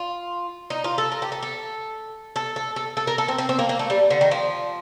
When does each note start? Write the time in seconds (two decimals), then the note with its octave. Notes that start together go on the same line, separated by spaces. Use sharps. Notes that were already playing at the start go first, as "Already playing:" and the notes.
Already playing: F4
0.70 D#4
0.84 F4
0.98 A4
1.12 A#4
1.22 G4
1.32 A4
1.43 A4
2.36 A4
2.56 A4
2.76 A4
2.97 A4
3.07 A#4
3.18 A4
3.28 C4
3.38 C4
3.49 C4
3.59 A#3
3.69 A#3
3.79 A3
3.90 G3
4.10 D3
4.21 D#3
4.31 F3